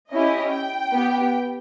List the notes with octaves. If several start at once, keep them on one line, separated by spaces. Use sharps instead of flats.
C#4 E4 G4 D#5
G5
B3 G4